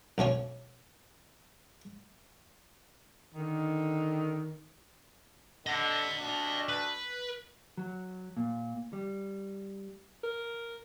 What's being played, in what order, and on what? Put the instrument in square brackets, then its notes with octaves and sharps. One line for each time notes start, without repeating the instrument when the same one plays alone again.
[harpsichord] B1 D3 C#4 C#5
[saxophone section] D3 D#3
[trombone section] D3 [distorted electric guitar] D#5 F#5
[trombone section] D2 D4
[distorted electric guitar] B4
[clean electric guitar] F#3
A#2
G3
[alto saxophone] A#4